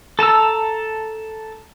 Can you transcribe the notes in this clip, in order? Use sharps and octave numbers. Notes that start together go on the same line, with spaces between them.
A4 A5 A#5 E6